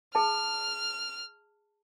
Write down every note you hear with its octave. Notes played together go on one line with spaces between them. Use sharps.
G#4 A5 F6